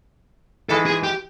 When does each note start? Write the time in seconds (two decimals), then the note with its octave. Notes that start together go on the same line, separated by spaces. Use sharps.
0.69 G#2 E3 G#3 A4
0.86 G#4
1.03 G4